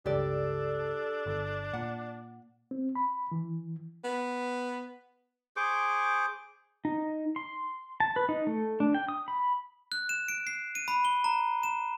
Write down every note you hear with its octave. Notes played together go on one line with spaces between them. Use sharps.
C#2 G2 D4 G4 A4 D5
G1
A#2 F#5
C4
B5
E3
B3
G#4 C5 C#6 D6
D#4
C6
A5
B4
D#4
A3
D4
G5
D#6
B5
F#6
E7
D7
C7
D#7
B5
G7
A#5
E7